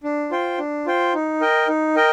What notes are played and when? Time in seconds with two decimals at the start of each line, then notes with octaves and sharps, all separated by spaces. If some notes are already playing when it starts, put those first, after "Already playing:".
0.04 D4
0.31 F4 C5 G5
0.59 D4
0.86 F4 C5 G5
1.14 D#4
1.41 A#4 D#5 G5
1.68 D#4
1.95 A#4 D#5 G5